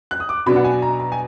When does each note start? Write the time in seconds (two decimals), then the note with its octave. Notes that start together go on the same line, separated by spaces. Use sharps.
0.11 F#6
0.20 D#6
0.29 D6
0.46 B2 F#3 B3 D4 B5
0.56 F#5
0.64 G#5
0.82 A#5
1.00 A#5
1.12 G#5